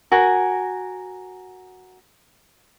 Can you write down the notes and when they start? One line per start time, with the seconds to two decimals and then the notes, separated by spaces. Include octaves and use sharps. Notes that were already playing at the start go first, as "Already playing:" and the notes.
0.12 F#4 A#4 G#5